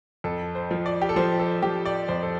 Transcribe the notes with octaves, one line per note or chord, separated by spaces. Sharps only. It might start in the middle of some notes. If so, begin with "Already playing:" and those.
F2 A4
C5
F3
D5
G4
A4
F3 C5
A4
F3 G4
D5
F2 C5
A4